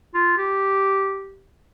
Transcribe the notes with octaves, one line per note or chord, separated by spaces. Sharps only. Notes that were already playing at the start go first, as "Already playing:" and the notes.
F4
G4